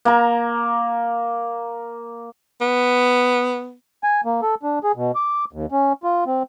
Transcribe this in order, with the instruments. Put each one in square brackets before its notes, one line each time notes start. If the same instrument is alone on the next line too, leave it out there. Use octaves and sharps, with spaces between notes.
[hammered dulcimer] A#3 A#5
[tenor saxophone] B3
[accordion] G#5
A#3
A4
D4
G#4
B2
D6
D#2
C#4
F4
C4